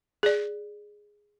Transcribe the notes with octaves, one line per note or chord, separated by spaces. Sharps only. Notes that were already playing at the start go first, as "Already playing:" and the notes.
G#4 D5